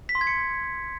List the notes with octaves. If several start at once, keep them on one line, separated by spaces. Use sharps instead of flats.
B6
C6
G#6
C#7